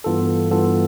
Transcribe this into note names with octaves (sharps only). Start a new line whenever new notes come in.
G2 E3 B3 F4 A4
G2 E3 B3 F4 A4